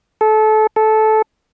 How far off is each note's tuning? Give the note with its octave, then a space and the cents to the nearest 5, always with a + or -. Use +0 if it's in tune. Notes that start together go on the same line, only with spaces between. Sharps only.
A4 -25
A4 -15